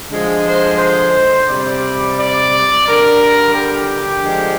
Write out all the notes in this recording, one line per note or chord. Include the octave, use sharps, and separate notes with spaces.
D3 F3 G#3
C5
C5
C3 G3 D5
D5
D3 G3 A#4
G4
D3 F3 G#3